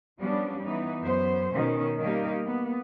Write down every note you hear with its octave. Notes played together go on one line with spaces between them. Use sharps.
F3 G3 B3 C#4 D4
E3 B3 D#4
F#2 B3 C5
B2 D#3 C#4
D#3 G3 A#3 D#4 G4 A#4
A#3 B3